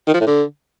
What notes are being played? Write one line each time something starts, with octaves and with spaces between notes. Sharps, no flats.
D#3
F3
A2
D3